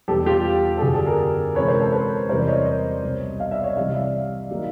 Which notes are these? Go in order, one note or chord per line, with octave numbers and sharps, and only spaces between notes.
E2 B2 G3 B3 G4 A4
F4 G4
A4
F#2 D3 F#3 B3 F#4 G#4
G4 A4
G#4 A#4
C3 E3 G#3 C#4 B4 C#5
A#4 C5
A4 B4
A4 B4
E2 C3 E3 G3 A#4 C5
D5
C#5 D#5
C#5 D#5
C2 B2 G3
D#5 F5
D5 E5
C#5 D#5
C3 E3 G3 D#5 F5
D5 E5
D#3 F#3 A#3 D#4